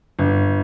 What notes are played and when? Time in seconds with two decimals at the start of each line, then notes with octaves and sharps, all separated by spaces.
0.19 G1